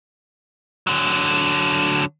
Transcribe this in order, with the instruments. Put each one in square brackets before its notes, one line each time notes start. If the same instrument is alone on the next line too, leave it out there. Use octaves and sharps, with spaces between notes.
[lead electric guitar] D3 F#3